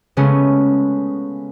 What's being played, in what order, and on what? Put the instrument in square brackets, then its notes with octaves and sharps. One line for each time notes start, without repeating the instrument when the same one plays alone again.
[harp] C#3 G#3 A3 B3 C#4